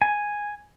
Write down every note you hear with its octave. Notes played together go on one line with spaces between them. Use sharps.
G#5